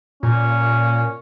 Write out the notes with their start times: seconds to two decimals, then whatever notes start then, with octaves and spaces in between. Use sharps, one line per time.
0.23 A#2 C#4